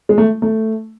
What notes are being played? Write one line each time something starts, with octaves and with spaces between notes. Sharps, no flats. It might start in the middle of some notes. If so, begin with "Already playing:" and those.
G#3
A3
A3